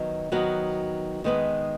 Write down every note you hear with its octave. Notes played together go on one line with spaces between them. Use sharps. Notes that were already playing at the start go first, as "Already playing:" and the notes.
Already playing: D#3 F#3 B3 F#4
D#3 F#3 B3 F#4
D#3 G#3 B3 G#4 B4